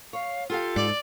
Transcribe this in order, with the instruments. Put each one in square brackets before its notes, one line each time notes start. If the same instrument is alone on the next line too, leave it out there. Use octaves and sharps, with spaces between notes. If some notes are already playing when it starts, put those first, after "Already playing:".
[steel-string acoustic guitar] C#5 [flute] F5
[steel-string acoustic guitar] F4 G4 F5 [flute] A4
[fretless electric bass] G#2 [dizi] D5